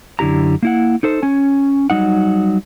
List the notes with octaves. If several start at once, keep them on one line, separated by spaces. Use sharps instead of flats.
F#2 D3 E4 G4 A#5
A#3 E4 F#5
D#4 A4 C5
C#4 G#5
F#3 G3 D#4 F#5